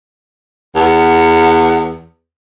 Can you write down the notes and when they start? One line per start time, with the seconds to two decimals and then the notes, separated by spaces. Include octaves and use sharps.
0.76 E2 F#5